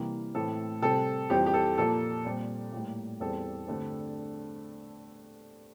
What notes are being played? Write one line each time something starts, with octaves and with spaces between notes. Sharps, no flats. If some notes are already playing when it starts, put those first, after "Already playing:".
Already playing: C3 E3 G3 A#3
A2 E3 A3 C4 A4
C3 G3 C4 A4
F2 E3 G3 C4 G4
G4
A4
A#2 F3 A#3 A4
A#2 G3 C4
A2 G3 A#3
E2 E3 G3 C4 A4
G2 D3 A3 C4